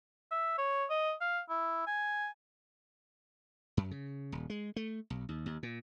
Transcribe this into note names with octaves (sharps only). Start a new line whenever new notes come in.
E5
C#5
D#5
F5
E4
G#5
F#2
C#3
D#1
G#3
A3
B1
D#2
D#2
A#2